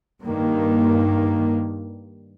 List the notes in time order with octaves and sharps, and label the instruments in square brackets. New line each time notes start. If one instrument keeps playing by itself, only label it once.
[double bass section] G2 D#3 A#3